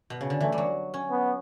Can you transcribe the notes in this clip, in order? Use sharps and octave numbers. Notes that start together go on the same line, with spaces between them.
B2
C#3
D3
E3 A3
G3
F#3
C#4
B3